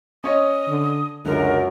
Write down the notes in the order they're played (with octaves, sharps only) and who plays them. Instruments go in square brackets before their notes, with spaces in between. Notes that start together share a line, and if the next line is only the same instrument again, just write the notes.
[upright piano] C#4 C#5 D#5 [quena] D#6
[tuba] D3
[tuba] C#2 [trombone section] F#2 [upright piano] D3 [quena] A#4